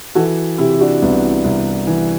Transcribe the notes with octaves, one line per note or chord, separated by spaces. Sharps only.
E3 F#4 A4
C3 E4 G4
D4 F#4
C2 B3 D4
C2
E3